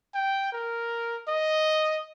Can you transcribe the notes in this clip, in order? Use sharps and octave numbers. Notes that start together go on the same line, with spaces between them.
G5
A#4
D#5